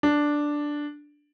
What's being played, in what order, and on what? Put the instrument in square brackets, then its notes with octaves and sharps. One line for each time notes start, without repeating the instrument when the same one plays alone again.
[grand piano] D4